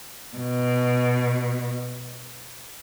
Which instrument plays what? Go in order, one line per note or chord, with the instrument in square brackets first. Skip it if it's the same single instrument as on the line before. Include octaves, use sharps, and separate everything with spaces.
[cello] B2